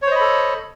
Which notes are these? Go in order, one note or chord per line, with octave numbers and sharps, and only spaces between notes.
A4 C5 C#5 D#5 B5